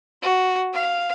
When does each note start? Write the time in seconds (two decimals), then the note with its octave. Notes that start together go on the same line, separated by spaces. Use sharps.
0.22 F#4
0.73 F5